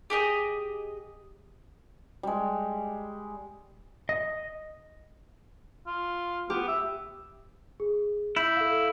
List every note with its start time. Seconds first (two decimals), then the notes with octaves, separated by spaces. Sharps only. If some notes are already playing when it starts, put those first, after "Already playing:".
0.10 G4 G#4 D#5
2.23 G3 G#3
4.09 D#5
5.87 F4
6.50 B3 G4
6.68 E5
7.80 G#4
8.36 E4 G6
8.56 A4 F5